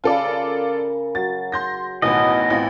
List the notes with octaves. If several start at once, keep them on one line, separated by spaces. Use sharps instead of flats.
C#3 F4 A4 D5 A5 B5
A#4
F#3 A6
C6 G6 A#6
A1 D#2 B2 E3 B3 D#5
A1 E3 C4 F4